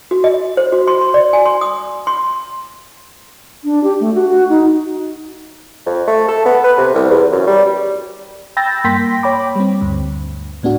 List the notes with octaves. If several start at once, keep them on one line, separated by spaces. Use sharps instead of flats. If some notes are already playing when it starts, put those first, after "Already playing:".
F#4
D#5
C5
F#4
C6
C6
D5
G#5
C6
D#6
C6
D4
G4
A3
F#4
F#4
D#4
F2
A3
A4
B3
B4
C3
C2
E2
F#2
G3
G5 B5 E6 G6 A6 A#6
G2 A#3 G5 C6 A#6 B6
C#5 G5 B5 D6
G3 C4
D2 G2
A2 B3 D4 F#4